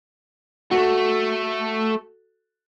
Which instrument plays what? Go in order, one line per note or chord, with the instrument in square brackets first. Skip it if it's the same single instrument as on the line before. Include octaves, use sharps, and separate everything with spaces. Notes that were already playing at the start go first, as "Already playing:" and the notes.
[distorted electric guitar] A3 [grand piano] F#4 A4